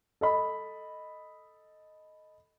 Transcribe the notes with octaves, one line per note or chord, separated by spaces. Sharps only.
A4 D#5 B5